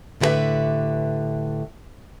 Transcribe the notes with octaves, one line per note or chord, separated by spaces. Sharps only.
A2 D3 E4 G4 B4 E5